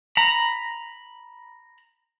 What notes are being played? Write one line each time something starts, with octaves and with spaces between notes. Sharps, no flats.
A#5 B5